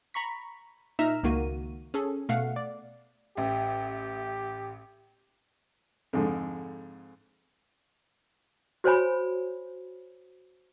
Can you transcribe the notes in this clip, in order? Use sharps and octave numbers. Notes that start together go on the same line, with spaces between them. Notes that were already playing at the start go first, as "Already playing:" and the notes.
A#5 B5 C#6 B6
A#2 D#4 E5 F6 A#6 E7
C#2 D#3 A#3 F#4 D#7
C#4 G#4 A4
B2 A3 F5 F#5
D5
A1 G4 E5 G5
F2 G#2 D3
F#4 C5 C#5 G#5 B5